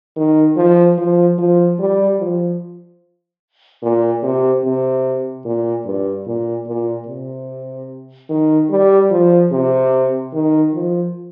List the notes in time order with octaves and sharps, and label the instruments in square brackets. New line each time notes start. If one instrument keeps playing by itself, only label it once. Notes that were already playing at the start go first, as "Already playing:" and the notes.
[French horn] D#3
F3
F3
F3
G3
F3
A#2
C3
C3
A#2
G2
A#2
A#2
C3
D#3
G3
F3
C3
D#3
F3